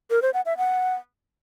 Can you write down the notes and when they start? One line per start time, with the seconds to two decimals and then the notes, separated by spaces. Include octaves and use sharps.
0.10 A#4
0.22 C5
0.34 F#5
0.46 E5
0.57 F#5